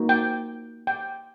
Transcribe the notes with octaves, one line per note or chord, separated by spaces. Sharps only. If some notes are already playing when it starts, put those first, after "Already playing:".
Already playing: A#3 D#4 F#4
G5
G5